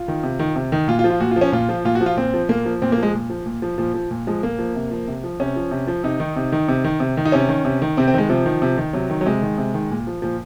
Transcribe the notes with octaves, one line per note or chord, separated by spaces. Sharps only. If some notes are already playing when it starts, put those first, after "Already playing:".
Already playing: F4
D#3
C3
D#3
C3
D#3
A#2 F4
F4
F3
F4
A#2 F#4
F4
F3
C#4
A#2 F4
F3
A#2 F4
F#4
F3
F4
A#2 C4
F3
A#2 A#3
F3
A#2 C4
A#3
F3
G#3
A#2
F3
A#2
F3
A#2 F3
F3
A#2
F3 G#3
A#2 A#3
F3
C3
F3
C3
F3
C3 C#4
F3
C3
F3
C3 D#4
D#3
C3
D#3
C3
D#3
C3
D#3
D#4
C3 C#4
D#3
C3
D#3
C3 C4
C4
D#3 G#3
C3 F3
D#3
C3
D#3
C3 F#3
D#3
F#3
C3 G#3
D#3
C3
D#3
A#2
F3
A#2 F3